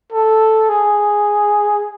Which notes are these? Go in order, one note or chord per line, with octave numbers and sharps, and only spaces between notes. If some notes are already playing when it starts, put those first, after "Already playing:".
A4
G#4